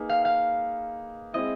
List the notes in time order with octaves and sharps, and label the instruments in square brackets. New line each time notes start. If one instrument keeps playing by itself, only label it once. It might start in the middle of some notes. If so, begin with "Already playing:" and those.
Already playing: [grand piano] A#3 D#4 G#4 B4
[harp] F5
F5
[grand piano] G#3 C4 E4 [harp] D#5